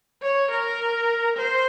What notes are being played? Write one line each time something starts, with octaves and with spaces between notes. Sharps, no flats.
C#5
A#4
C5